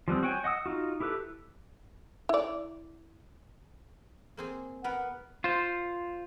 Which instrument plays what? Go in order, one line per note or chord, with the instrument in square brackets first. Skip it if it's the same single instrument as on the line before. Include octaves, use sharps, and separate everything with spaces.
[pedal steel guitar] F3 G3 B3 C4
F#4 C#5 G5 G#5
D#5 F#5 D#6 E6
D#4 F4 F#4
E4 G4 A4 B4
[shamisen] E4 D5
[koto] A#3 C4 G#4
[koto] B3 A#4 B4 [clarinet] F#5
[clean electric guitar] F4 C5